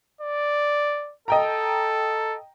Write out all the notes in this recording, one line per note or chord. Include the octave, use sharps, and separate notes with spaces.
D5
A4 D#5 G5 A#5